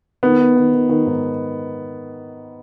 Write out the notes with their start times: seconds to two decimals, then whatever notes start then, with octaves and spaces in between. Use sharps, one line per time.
0.23 D#3 B3
0.39 D#3
0.56 D#3
0.73 D#3
0.89 D#3
1.06 G#2